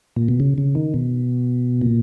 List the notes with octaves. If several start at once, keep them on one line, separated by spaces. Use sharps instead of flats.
A#2
B2
C#3
C#3
D#3
B2
A#2